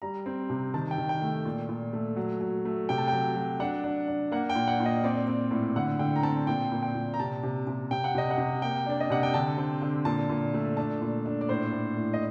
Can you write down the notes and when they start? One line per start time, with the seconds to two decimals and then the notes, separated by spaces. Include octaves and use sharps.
0.02 G3 A#5
0.26 C4
0.50 C3
0.74 D#3 A5
0.91 G5
0.98 D#3
1.09 G5
1.22 A3
1.45 A#2
1.69 A#2
1.93 A3
2.16 F#3
2.41 F#3
2.65 A3
2.89 C3 G5
2.98 A5
3.08 F#3 G5
3.36 F#3
3.60 D4 F#5
3.84 D4
4.08 D4
4.32 A#3 F#5
4.50 G5
4.55 A#2
4.68 F#5
4.80 A#2
4.86 D#5
5.04 C4 D5
5.27 C4
5.51 A2
5.76 D3 F#5
5.99 D3 G5
6.16 A#5
6.23 C4 A5
6.47 A#2 G5
6.72 A#2
6.82 G5
6.95 A#2
7.14 A#5
7.20 C3 A5
7.43 C3
7.67 C3
7.91 C3 G5
8.04 F#5
8.15 C3 D#5
8.31 F#5
8.38 C3
8.62 A#3 G5
8.86 D4 D5
9.00 D#5
9.10 C3 F#5
9.23 G5
9.34 D3 A5
9.58 C4
9.82 D3
10.05 A#2 A5
10.30 A#2
10.54 A3
10.77 D4 A5
11.02 A#2
11.26 D4
11.41 D5
11.49 A2 C5
11.72 A2
11.97 A2
12.13 D#5